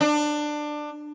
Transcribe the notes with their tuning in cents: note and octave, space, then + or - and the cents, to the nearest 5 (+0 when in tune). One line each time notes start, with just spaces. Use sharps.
D4 +20